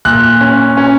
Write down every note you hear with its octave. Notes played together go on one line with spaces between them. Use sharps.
A#2 F#6
C#4
C#4